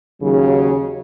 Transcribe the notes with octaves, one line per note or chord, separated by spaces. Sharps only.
D#2 C#3 F#3